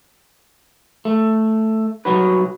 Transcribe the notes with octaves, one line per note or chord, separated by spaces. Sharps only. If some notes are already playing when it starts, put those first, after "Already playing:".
A3
C2 C3 F#3 F#4 B4